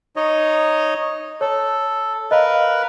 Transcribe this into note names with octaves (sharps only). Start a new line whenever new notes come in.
D#4 C#5 D#5
A4 C#5
A#4 B4 D#5 F5